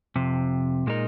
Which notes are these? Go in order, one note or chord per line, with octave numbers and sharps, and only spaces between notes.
F2 C3
A#2 G#3 D#4 A#4